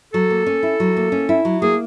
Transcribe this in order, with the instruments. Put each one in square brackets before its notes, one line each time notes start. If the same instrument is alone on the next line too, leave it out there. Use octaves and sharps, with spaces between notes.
[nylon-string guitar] F#3 [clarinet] A4
[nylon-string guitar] A#3
C#4
E4
F#3
A#3
C#4
E4
F#3
[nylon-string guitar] A#3 [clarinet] G#4